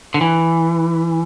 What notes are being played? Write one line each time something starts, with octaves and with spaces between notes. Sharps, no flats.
D3
E3